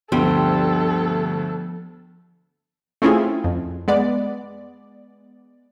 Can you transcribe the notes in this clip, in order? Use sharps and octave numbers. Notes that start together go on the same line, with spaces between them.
D2 G2 F3 G3 B3 C4 A4
A3 C4 C#4 E4 F4 G#4
F2
G#3 B3 D5